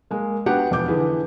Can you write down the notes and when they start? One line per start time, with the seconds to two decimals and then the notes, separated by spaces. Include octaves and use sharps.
0.11 G#3 A#3
0.46 B3 D4 F#4 G4 F#5
0.71 E1 F2 B3 D6 G6
0.88 D3 E3 G#4 B4